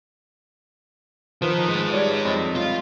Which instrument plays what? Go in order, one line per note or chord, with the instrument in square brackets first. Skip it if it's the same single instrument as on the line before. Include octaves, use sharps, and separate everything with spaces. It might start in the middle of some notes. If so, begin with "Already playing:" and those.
[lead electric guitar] D#3 [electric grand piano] F3 B4
[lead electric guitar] G#3 D#4
[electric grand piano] G3 C#5 D5
F2 D#5
[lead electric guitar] F4